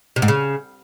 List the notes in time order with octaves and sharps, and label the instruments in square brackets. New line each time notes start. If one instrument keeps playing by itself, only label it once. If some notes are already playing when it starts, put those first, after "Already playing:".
[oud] C3
G#2
C#3